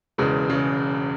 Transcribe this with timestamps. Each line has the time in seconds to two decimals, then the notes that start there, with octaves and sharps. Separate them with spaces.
0.18 E1 E2 C#3 G#3
0.50 C#3